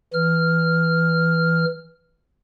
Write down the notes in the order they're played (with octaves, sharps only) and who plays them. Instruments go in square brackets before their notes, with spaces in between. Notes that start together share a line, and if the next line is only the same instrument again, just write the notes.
[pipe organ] E3 F6